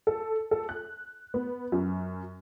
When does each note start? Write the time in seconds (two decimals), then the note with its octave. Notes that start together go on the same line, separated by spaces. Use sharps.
0.07 A4
0.51 A4
0.69 F#6
1.34 B3
1.72 F#2